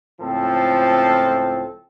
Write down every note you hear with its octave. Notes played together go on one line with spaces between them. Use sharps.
C#2 A2 F3 C4 A4